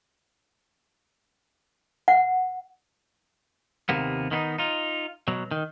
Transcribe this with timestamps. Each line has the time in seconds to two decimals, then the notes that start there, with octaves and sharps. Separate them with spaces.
2.08 F#5
3.89 D#2 C3 A#3 B3
4.31 D#3 B3 C#4 D#4
4.58 D#4 F4
5.28 B2 F#3
5.51 D#3